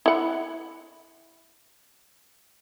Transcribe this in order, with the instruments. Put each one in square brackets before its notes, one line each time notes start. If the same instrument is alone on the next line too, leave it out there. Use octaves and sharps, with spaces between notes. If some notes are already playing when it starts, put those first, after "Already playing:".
[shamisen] E4 F#5